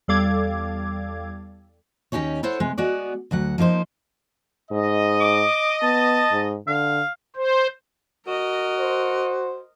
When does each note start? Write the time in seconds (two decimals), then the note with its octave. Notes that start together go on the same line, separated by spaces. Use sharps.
0.08 E2 G3 A4 F5 D6 G#6
2.12 D#2 C#4 D#4 G4 G#4 C#5
2.43 E4 A4 C5 C#5 F#5
2.60 C3 G#3 B4
2.78 G#3 B3 F#4 D5
3.31 D2 F#3 F#5
3.58 F3 A#3 D#4 C5
4.71 G#2 D#5
5.20 D6
5.83 B3 A5
6.32 G#2
6.67 D3 F5
7.36 C5
8.27 F#4 A#4 D#5
8.80 C5